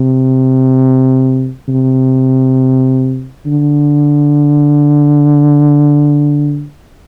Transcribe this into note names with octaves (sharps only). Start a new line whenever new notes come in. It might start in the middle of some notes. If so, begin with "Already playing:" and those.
Already playing: C3
C3
D3